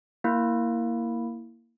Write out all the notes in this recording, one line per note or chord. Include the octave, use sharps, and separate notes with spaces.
A#3 E4